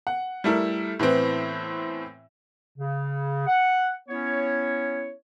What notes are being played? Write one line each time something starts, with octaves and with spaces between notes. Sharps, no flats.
F#5
G3 A3 E4 A#4
A2 E3 B3 C4
C#3
F#5
B3 C#4 E4 C#5